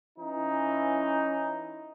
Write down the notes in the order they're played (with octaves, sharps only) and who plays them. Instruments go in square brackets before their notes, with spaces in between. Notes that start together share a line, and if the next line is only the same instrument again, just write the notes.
[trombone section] E3 C#4 D#4